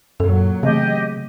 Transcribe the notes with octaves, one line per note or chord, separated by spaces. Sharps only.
F#2 A#2 F#3 A4
C#3 E3 A3 C4 G4 D#5